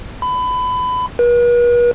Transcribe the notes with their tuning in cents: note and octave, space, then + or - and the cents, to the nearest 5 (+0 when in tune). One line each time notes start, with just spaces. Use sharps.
B5 +25
B4 -45